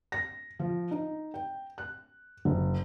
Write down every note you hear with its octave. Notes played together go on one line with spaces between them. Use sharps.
A#6
F3
D#4
G5
F#6
F#1